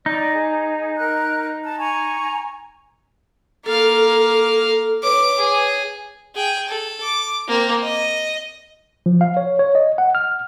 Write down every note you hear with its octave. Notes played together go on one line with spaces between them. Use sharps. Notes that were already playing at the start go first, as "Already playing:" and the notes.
D#4 D5 D#5
G#4
A#4 F#6
A5
G#5 A#5 C#6
A#3 A4 F5
B4 C#5 D6
G#4
G#4 G5
A4
D6
A#3 C4
D#5
F3
F5
C#5
C#5
D#5
F#5
F6